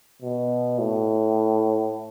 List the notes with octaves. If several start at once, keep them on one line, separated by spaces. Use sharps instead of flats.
B2
A2